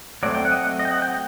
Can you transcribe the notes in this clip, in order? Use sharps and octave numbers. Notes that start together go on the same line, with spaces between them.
F#3 A3 C4 D5
G5
F#5
D#5
F#5
D#5
G5
F#5
G5